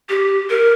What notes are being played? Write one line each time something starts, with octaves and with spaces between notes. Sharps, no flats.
G4
A#4